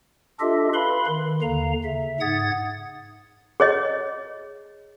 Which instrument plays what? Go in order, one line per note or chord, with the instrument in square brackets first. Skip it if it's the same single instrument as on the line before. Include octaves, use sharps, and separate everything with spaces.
[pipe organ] D4 F4 G4 A4 D#5 E5
B4 F5 B5 C6
D#3
D#2 D3 F5 A#5
C#3 E5
G#2 F#5 D#6 G#6 A6
[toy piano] G#4 C#5 D#5